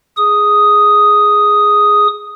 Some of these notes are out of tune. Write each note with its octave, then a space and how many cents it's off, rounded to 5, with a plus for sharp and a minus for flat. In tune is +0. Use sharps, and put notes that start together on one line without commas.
G#4 +0 D#6 +0